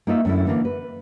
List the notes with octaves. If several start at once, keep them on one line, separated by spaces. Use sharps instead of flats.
A#3 D#4 F4 E5
F#2 D3 A3 E4
D3 E3 A#3
B4